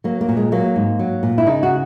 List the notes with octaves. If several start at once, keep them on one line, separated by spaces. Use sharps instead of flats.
F#3 A#3
A#3
A#2
G#3
F#3 A#3
G#2
F#3
A#2
E4
C#3 D#4
F#4